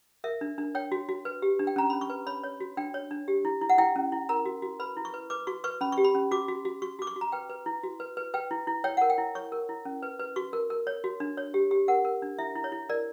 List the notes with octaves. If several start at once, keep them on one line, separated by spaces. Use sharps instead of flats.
A#4 E5
D4
D4
C#5 G5
F#4
F#4
B4
G4
D4
G5
C#4 A#5
C#4 B5
C#6
B4
C#5 B5
C#5
F#4
D4 G5
C#5
D4
G4
E4
E4
F#5
E4 G5
C#4
E4
A#4 A#5
F#4
F#4
B4 B5
E4
C#6
B4
B4 D6
F#4 C#6
B4 C#6
C#4 B5
C#6
G4
B5
C#4
F#4 D6
F#4
F#4
F#4 C#6
F#4 D6
C#6
F#4
A#5
B4 G5
B4
E4
F#4
B4
B4
B4 G5
E4
E4
C#5 G5
A#4 F#5
G5
E4
C#5 C#6
A#4
E4
C#4
B4
B4
F#4 C#6
A#4
A#4
C#5
F#4
D4
C#5
G4
G4
A#4 F#5
A#4
D4
E4 E5
E4
C#5
E4
A#4 D5